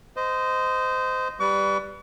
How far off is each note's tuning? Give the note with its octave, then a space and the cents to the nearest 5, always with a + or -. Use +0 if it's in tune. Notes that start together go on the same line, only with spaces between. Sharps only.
C5 -25 D#5 +0
G3 +0 B4 +0 C#6 +45